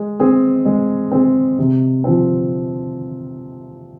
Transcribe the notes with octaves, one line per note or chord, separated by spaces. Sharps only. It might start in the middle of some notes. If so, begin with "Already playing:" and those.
Already playing: G#3
C4 G#4
G#3
C4 G#4
C3
F3 C4